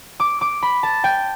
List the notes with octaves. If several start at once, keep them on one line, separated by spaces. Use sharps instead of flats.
D6
D6
B5
A5
G5